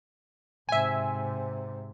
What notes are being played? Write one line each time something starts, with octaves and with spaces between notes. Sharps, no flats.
G#2 C3 E5 G#5